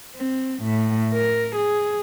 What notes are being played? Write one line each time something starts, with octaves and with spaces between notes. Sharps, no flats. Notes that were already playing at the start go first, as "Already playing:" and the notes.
C4
A2
A#4
G#4